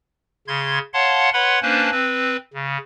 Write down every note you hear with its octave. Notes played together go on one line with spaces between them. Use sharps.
C#3 C6 G#6
C#5 F5 F#5 A5 C6
B4 C#5 F#5 B5 C6
A#3 C#4 D4 B4 C5 A5
C4 B4
C#3